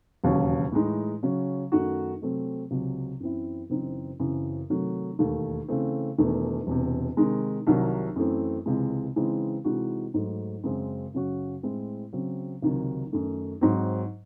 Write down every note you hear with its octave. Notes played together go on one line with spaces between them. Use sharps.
E1 D#2 C#3 F#3 C#4
A2 E3 G#3 D#4
C#3 F#3 C#4
F#2 D#3 A3 D#4 F#4
C3 F#3 A3 C4
C#2 C3 F#3
F#2 E3 C4 E4
F#1 F#2 E3 C4 D#4
F#1 F#2 C#3 E3 C4
C3 D#3 F#3 A3
E1 D#2 D#3 A3
C#3 E3 A3 C4
E1 E2 D#3 A3
E1 E2 C3
C3 D#3 G#3
C2 C3 D#3 F#3
F#2 E3 A3 C4
C#2 C3 E3 G#3
C#3 E3 G#3 C4 D#4
C3 E3 G#3 D#4 F#4
G#2 F#3 A3
F#2 C#3 G#3 C4
F#2 C#3 F#3 C#4 F#4
A2 G#3 C4 E4
C#3 F#3 C4
C#2 C3 D#3 F#3
F#2 D#3 A3
G#2 F#3 C4